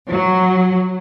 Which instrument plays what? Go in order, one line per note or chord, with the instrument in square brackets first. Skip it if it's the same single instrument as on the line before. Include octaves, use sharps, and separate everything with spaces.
[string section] F#3